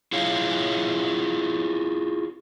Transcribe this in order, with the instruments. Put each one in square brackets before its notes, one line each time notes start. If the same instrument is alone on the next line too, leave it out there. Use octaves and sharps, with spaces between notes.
[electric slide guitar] E4 F4 G#4 C#5 F5